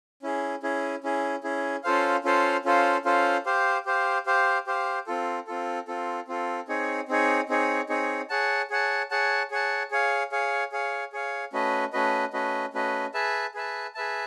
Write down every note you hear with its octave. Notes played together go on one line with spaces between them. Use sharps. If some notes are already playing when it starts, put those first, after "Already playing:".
C#4 E4 G#4
C#4 E4 G#4
C#4 E4 G#4
C#4 E4 G#4
C#4 F4 A4 C5 F5
C#4 F4 A4 C5 F5
C#4 F4 A4 C5 F5
C#4 F4 A4 C5 F5
G4 C5 F5
G4 C5 F5
G4 C5 F5
G4 C5 F5
C4 F4 A4
C4 F4 A4
C4 F4 A4
C4 F4 A4
C4 D#4 G#4 C#5
C4 D#4 G#4 C#5
C4 D#4 G#4 C#5
C4 D#4 G#4 C#5
G#4 C#5 F#5 A5
G#4 C#5 F#5 A5
G#4 C#5 F#5 A5
G#4 C#5 F#5 A5
G#4 C#5 F5
G#4 C#5 F5
G#4 C#5 F5
G#4 C#5 F5
A3 C#4 F#4 B4 D#5
A3 C#4 F#4 B4 D#5
A3 C#4 F#4 B4 D#5
A3 C#4 F#4 B4 D#5
G#4 B4 E5 A5
G#4 B4 E5 A5
G#4 B4 E5 A5